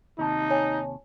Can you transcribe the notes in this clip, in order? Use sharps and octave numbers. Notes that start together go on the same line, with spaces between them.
D#2 C3 D#4 A5
C#5 G#5